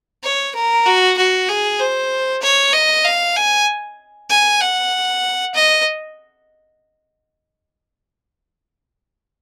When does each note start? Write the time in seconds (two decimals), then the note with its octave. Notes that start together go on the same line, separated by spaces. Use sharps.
0.24 C#5
0.55 A#4
0.86 F#4
1.18 F#4
1.49 G#4
1.80 C5
2.42 C#5
2.74 D#5
3.05 F5
3.36 G#5
4.30 G#5
4.61 F#5
5.55 D#5